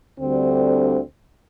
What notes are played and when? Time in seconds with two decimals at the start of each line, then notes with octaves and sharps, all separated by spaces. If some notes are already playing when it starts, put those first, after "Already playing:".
0.18 D2 D3 G3 C4